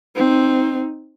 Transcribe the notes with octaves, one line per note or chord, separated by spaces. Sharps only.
C4 D#4